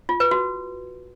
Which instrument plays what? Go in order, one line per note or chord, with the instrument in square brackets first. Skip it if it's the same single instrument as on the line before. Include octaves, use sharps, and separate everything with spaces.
[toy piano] F4
B4
F#4